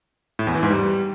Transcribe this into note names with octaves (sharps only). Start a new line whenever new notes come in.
A2
E2
E3
G#2
G3